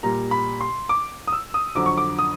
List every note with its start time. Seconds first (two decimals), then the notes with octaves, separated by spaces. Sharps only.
0.03 A#2 G3 A#5
0.31 B5
0.61 C6
0.89 D6
1.28 D#6
1.32 E6
1.54 D#6
1.75 F2 D3 F#3 D6
1.86 C#6
1.97 D6
2.19 D#6